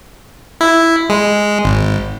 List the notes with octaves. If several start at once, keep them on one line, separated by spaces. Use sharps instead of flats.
E4
G#3
G#1